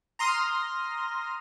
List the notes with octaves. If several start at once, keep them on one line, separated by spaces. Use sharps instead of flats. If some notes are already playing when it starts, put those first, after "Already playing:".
A#5 C6 D#6 F6 A#6